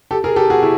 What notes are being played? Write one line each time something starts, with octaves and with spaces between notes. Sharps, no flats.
G4 A4
G#4 A#4
G4 A4
F#4 G#4
E4 F#4